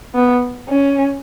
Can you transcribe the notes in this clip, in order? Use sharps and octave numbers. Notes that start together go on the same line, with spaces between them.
B3
C#4